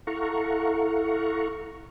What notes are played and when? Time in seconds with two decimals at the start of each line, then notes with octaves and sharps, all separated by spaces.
0.07 E4 A4 F5 F#5 A#5 C#6